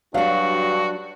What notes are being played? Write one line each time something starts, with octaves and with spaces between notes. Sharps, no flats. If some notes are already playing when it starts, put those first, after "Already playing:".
G2 F#3 D4 F#4 F5